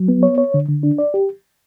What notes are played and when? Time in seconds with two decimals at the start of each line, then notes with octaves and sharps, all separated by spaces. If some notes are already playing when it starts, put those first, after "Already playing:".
Already playing: F#3
0.08 B3
0.23 C#5
0.38 C#5
0.54 D3
0.69 D3
0.83 D4
0.98 D5
1.14 G4